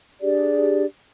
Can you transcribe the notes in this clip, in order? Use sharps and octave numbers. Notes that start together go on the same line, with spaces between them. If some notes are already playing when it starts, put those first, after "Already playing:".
D4 G4 G#4 D5